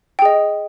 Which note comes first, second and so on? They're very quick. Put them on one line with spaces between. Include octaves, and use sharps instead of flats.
G5 G#4 D#5